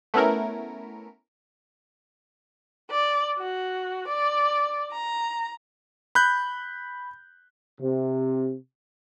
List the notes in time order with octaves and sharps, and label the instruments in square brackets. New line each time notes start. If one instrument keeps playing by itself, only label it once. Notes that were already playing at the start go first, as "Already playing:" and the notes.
[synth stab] A3 B3 C#4 E4 A#4
[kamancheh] D5
F#4
D5
A#5
[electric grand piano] B5 F#6 G6
[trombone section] C3